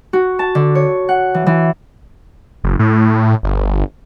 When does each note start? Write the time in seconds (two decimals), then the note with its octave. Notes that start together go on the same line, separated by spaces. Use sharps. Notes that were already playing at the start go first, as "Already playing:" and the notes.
0.13 F#4
0.39 A5
0.55 D3
0.75 C#5
1.09 F#5
1.34 E3
1.46 E3
2.64 F#1
2.79 A2
3.43 G1